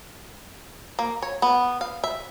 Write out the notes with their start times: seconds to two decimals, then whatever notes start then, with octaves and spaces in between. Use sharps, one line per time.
0.99 A#3
1.22 C#5
1.42 B3
1.81 F5
2.04 E5